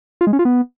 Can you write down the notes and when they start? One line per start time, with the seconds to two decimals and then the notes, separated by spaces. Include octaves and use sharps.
0.21 F4
0.27 G#3
0.33 C#4
0.39 F4
0.45 B3